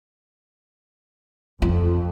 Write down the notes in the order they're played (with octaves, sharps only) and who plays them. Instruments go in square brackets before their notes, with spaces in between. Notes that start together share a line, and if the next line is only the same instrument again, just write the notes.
[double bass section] F2 [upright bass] F4